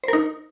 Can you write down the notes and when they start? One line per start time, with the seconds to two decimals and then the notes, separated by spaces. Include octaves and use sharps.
0.04 C5
0.08 A#4
0.13 D#4